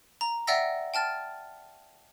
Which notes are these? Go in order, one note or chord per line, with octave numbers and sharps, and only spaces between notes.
A#5
D5 E5 F#5 G5 E6 A#6
G5 A5 F6 A6